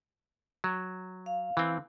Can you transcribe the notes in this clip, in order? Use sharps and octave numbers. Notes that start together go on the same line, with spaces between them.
F#3
F5
E3 C4